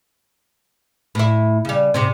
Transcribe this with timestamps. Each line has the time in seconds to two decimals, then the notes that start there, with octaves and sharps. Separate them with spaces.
1.15 A2 E4
1.65 C#3 G3
1.94 G#2 C3 C4